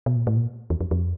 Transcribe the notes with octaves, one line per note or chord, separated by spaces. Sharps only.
B2
A#2
A2
A#2
E2
F2
F2